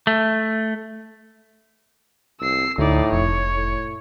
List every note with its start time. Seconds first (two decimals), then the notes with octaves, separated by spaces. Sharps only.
0.07 A3
2.41 C2 E6 C7
2.78 D2 A2 D#4 D5
3.13 F1 C#5
3.56 A2